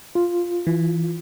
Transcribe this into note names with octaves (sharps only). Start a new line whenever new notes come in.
F4
E3